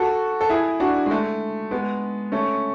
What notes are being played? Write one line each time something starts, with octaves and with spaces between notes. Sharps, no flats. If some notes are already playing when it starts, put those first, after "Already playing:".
Already playing: F#4 A4
A4
E4 G#4
D4 F#4
G#3
A3
G#3 B3
A3 C#4